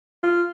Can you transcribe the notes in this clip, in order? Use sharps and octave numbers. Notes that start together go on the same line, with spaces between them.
F4